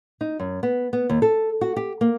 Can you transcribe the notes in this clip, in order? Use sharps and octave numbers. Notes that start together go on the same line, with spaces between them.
D#4
F#2
B3
B3
D#2
A4
F#4
G4
A#3